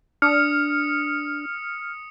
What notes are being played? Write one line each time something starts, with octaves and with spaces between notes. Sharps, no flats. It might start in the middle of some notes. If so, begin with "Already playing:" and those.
D4 D#6 F6 C#7